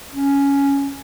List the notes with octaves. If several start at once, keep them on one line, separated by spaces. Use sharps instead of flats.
C#4